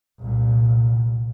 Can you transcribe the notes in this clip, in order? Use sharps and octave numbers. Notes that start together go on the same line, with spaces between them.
C2 A#2